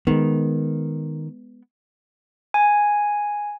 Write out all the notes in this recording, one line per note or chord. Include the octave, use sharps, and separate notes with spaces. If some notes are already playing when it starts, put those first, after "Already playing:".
D#3 G#3 B3
G#5